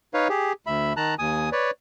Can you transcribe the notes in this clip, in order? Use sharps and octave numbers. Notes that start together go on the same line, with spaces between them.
D#4 B4 C#5 F5
G4 G#4
D2 E5 B5
D#3 A5 A#5 F#6
D#2 G#5 D#6
B4 C#5 D5